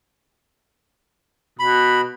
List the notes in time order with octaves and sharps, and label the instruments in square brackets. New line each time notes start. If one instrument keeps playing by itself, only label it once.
[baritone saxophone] B2 [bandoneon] B5